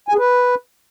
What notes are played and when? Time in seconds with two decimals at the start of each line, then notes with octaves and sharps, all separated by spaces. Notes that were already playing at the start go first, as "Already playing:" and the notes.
0.08 G#5
0.14 G#4
0.19 B4